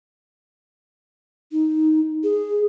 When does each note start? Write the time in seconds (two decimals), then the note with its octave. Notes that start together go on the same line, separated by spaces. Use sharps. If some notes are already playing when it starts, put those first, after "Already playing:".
1.52 D#4
2.23 G#4